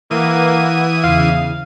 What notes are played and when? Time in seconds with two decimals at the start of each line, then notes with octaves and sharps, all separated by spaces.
0.11 E3 A#3 B4 F#5 D#6
1.03 E2 C#3 F5